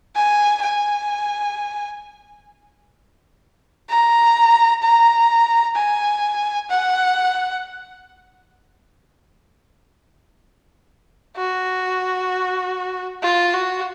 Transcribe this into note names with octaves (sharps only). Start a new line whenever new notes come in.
G#5
G#5
A#5
A#5
G#5
F#5
F#4
F4
F#4